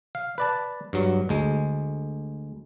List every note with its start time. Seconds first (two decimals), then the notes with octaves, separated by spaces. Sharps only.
0.15 F5
0.38 B4 D5 A5
0.93 G2 F#3
1.29 D2 G#3